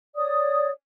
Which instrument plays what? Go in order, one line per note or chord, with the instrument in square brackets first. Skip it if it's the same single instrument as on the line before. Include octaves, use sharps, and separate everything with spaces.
[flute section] C#5 D5 D#6